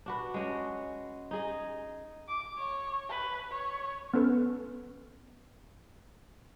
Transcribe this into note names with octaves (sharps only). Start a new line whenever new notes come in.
D4 F#4 B4
G#3 C#4 F#4
D#4 G#4 D#5
D6
C#5
B4
C#5
B3 C#4 A4 B4